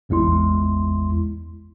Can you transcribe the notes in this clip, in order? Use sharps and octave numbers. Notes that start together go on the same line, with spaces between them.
A1 E2 G#3 E4 C6